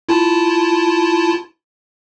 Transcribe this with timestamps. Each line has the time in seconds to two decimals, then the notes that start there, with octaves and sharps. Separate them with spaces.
0.09 E4 F4 A5